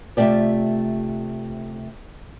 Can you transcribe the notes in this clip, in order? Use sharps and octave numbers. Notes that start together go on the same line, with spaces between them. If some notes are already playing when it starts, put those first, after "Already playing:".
C3 A3 F4 G4 D5